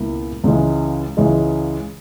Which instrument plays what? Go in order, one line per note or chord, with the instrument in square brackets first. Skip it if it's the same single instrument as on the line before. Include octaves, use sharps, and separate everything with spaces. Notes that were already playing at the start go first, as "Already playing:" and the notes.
Already playing: [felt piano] C#2 B2 A#3 E4
C#2 C#3 E3 G#3
C#2 C#3 E3 G#3